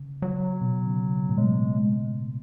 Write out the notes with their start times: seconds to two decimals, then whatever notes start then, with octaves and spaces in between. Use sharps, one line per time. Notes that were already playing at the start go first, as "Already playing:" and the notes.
Already playing: C#3
0.22 F#3
0.61 B2
0.86 C#3
1.29 A2
1.38 B2 G#3